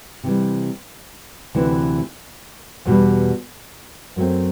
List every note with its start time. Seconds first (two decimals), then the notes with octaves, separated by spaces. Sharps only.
0.23 C3 E3 G3
1.55 D2 C3 E3
2.86 E2 B2 G3
4.16 F#2 F#3 A3 C4